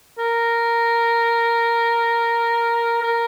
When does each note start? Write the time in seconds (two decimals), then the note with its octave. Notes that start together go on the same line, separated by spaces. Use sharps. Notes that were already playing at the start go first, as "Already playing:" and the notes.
0.19 A#4
3.03 A#4